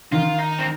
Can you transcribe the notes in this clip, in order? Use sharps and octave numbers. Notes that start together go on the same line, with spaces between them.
D#3 F4
D#4
C4